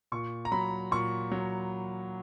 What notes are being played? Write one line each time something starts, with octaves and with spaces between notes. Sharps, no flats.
A#2 C#6
A#5
F#3 B5
A#2 C#6
F#3